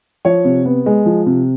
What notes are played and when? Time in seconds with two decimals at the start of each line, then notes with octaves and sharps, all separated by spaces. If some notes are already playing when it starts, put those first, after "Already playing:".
0.25 F3 C#5
0.45 C3
0.65 B3
0.86 G#3
1.06 F3
1.26 C3